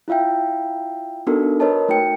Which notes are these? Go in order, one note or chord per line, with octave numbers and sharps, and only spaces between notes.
E4 F4 E5 F5 G5
B3 D4 D#4 F#4 A4 A#4
A#4 B4 C#5 D#5 A5
A3 D#4 F#4 G5 C#7